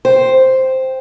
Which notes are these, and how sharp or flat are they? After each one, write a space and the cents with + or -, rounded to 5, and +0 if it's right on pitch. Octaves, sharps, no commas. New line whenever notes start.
C5 +0 G5 +0